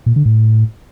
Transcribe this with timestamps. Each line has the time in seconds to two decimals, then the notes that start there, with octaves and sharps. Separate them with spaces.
0.06 A#2
0.16 D3
0.26 A2